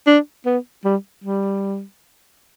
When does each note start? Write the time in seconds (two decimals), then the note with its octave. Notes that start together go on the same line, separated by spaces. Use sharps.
0.07 D4
0.46 B3
0.84 G3
1.24 G3